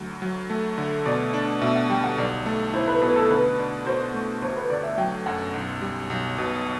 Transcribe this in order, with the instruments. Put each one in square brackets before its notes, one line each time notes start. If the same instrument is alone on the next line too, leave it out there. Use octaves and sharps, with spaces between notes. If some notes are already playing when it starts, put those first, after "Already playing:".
Already playing: [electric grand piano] D2 F#3
F#3
A3
D3
[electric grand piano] B2 [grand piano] D5
[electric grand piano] D4
[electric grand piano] B2 [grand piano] E5
[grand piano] F#5
[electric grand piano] G3 [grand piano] G5
[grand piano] F#5
[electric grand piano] B1 [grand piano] D5
[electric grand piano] A3
[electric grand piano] E4 [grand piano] C5
[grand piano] B4
[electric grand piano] B2 [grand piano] B4
[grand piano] A4
[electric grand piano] D3 [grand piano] B4
[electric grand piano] D4
[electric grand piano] F#4 [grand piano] C5
[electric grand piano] A3
[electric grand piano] G1 [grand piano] C5
[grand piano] B4
[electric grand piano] D3 [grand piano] D5
[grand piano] E5
[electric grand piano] F#3 [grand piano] G5
[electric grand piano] F#2 [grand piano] F#5
[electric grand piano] B1
G3
B1
B2